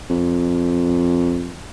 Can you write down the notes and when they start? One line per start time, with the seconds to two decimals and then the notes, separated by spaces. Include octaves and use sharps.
0.10 F2